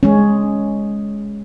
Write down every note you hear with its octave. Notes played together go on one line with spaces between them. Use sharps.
G#3 C#4